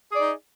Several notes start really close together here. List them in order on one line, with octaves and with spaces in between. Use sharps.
G#4 D5 D#4